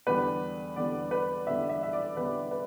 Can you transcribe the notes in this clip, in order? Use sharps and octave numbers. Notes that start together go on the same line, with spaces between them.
E2 D3 G3 B3 B4
E2 D3 G3 B3 D5
B4
E2 D3 G3 B3 E5
E5
E5
D5
E2 D3 G3 B3 B4
B4